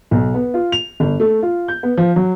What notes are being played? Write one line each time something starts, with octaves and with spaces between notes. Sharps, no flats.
B1
B3
F4
F7
G1
A3
F4
G6
B3
F3
F#3